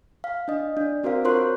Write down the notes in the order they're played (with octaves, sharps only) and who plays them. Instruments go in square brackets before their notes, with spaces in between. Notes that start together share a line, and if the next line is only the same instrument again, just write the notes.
[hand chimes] F5
D4 D#5
D4 D5
C4 F#4 A#4 C5 F5
F4 A#4 C5 C#5 C6 F#6
C#5